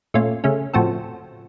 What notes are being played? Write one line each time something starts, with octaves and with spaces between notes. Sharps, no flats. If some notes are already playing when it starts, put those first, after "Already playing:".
A#2 A3 C#4 F4
C#3 A3 C#4
A2 F3 C4 F#4 A4